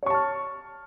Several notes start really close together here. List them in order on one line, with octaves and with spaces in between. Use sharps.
C#5 C#6 A5 F6